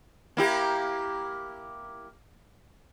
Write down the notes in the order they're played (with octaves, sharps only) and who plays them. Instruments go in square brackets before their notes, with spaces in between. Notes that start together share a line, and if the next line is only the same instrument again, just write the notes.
[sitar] A#3 E4 G4